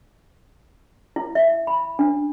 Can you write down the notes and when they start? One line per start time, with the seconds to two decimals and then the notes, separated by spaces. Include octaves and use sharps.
1.16 E4
1.35 E5
1.67 B5
1.99 D4